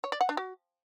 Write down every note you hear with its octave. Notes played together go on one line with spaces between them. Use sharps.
C#5
D5
F#5
D4
F#4